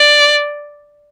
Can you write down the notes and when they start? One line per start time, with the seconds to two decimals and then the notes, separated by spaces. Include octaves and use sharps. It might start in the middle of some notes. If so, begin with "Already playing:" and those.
Already playing: D5